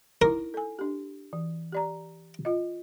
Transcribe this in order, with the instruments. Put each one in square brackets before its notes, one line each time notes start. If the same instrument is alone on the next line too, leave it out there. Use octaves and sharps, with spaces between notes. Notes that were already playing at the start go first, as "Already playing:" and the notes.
[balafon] D#4 E4 [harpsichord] A#4
[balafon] A4 G#5
D4 G4
E3
G4 D5 A#5
F4 D#5